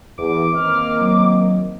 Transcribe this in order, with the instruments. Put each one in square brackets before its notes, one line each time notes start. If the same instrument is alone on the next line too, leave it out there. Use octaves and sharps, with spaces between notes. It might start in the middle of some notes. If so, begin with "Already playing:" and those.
[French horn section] E2 [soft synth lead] E3 [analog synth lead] D6
[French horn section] D#3 C4 D#5 [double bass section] A#3 [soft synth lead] F6
[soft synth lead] F#3